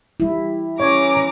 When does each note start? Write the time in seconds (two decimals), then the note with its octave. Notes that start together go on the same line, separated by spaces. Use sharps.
0.20 G3 E4
0.80 E3 C#4 C#5 A#5 D6